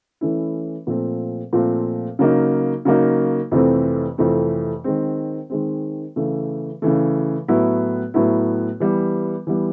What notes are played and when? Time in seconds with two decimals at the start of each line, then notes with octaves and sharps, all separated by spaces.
0.21 E3 A3 C#4 E4
0.87 A#2 F3 A3 C4
1.53 A#2 F3 A3 C4
2.19 C#3 F#3 A#3 D#4
2.85 C#3 F#3 A#3 D#4
3.51 F2 C3 E3 A3 C4
4.18 F2 C3 E3 A3 C4
4.84 D#3 G#3 C4
5.50 D#3 G#3 C4
6.16 C#3 E3 A3
6.82 C#3 E3 A3
7.48 A2 F#3 B3 E4
8.14 A2 F#3 B3 E4
8.80 E3 G3 B3
9.47 E3 G3 B3